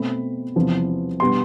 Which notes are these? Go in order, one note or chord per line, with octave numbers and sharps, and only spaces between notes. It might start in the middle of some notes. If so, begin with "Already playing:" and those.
Already playing: B2 A3 C4 B5
E2 C3 F3 B3
B2 G3 B3 C6